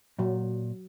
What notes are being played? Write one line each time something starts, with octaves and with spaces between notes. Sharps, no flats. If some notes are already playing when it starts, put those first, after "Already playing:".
A#2 F#3